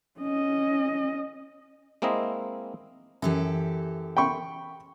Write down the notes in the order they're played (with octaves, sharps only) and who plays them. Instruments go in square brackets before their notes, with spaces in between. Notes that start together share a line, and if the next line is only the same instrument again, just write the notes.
[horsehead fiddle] C#4 D#5
[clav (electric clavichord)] G#3 A#3 C4 E4 D#5 E5
[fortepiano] F#2 [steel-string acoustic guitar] E3 G4 A4
[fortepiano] G5 B5 C#6